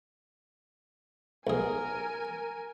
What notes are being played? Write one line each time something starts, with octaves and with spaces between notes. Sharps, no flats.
B1 G#4 A#4 G#5